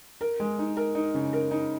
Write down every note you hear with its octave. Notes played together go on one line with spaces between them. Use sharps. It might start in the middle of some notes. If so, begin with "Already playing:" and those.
A#4
G#3
D#4
A#4
D#4
C#3
A#4
D#4